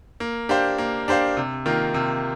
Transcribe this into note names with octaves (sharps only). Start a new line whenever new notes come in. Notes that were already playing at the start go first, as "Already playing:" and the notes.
A#3
D4 G4 C5 F5
A#3
D4 G4 C5 F5
C3
D#3 A#3 F4
C3